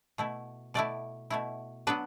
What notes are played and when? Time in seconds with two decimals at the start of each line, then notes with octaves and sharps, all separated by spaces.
0.18 B2 A3 E4
0.74 B2 A3 E4 D5
1.30 B2 A3 E4
1.87 F#3 B3 D4 B4